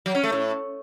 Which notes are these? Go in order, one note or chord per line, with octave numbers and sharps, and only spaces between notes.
F#3
C#4
A3
A2